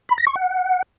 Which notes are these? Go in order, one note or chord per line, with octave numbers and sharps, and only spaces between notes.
B5
A#6
C#6
F#5